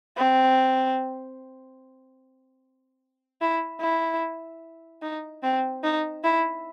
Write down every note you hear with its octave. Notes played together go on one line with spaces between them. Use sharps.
C4
E4
E4
D#4
C4
D#4
E4